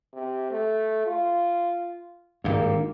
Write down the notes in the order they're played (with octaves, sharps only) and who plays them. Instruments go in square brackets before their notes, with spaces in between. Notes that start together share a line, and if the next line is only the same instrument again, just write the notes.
[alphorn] C3
A3
F4
[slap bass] G#1 G2 [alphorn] A#3